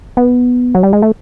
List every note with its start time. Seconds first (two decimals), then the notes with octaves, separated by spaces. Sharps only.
0.17 B3
0.75 F#3
0.83 G3
0.93 G#3
1.02 A3